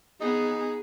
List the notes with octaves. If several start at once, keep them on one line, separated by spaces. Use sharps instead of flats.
B3 D#4 G#4